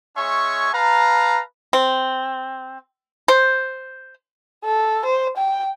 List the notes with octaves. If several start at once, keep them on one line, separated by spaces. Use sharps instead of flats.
G#3 C#4 C#5 E5 G#5 C#6
B4 F5 A5 A#5
C4
C5
A4
C5
G5